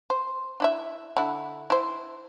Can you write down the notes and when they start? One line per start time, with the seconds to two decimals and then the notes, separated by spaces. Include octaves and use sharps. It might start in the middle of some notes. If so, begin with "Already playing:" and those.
0.10 C5
0.60 D4 E4 E5
1.17 D3 E4
1.70 E4 C5